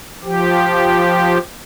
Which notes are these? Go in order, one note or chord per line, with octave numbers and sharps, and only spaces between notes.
F3 G4